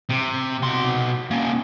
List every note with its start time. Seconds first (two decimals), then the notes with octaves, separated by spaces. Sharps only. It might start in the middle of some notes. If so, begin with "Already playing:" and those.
0.09 C3
0.63 B2 C6
1.31 A#3 C#4